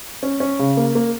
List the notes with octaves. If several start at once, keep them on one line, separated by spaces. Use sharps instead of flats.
C#4
C#4
C#3
A#3
A#3